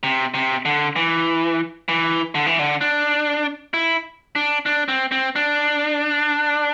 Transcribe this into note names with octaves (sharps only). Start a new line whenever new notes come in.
C3
C3
D3
E3
E3
D3
E3
D3
D4
E4
D4
D4
C4
C4
D4